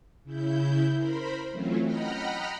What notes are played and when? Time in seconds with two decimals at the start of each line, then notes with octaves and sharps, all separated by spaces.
0.24 C#3 E4 G6
0.93 A#4 C5 B5
1.51 E3 F#3 A3 C4 C#4 F4
1.82 D#5 F#5 G5 A#5 B5 F6